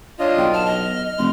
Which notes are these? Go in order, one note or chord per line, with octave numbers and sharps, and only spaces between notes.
D4 F4 C#5 D#5
B1 G5
A5 F6
D#5
F1 C6